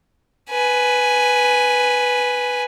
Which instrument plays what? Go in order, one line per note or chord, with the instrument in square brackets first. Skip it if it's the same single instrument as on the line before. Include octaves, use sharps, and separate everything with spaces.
[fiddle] B4 G#5